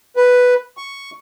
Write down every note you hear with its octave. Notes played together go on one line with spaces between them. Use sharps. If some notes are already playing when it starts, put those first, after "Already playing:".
B4
C#6